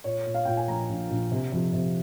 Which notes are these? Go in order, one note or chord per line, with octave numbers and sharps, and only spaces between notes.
A#2 C#5
A#2
F5
A#2 G5
G#5
A#1 A#5
A#1
A#1
C3
F2
C3